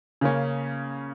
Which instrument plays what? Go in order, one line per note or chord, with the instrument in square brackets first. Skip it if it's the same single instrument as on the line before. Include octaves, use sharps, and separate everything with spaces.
[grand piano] C#3 A#3 C#4